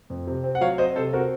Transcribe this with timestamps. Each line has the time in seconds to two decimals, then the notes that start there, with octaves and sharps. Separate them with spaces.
0.10 F2
0.27 C3
0.44 C4
0.55 F#5
0.61 F#3 C#5 F5
0.78 C4 C5 D#5
0.96 C3 A4 C5
1.13 C4 F#4 A#4